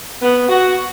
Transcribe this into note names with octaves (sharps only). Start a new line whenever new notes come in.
B3
F#4